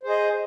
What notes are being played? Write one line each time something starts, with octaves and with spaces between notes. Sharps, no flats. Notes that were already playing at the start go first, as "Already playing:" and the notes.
G#4 C5 D#5